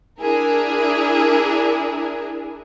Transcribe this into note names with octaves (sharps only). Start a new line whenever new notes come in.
D4 E4 G#4 A#4